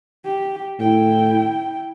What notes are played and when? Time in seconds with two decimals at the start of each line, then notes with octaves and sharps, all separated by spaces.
0.25 G4
0.80 A2 E4 G5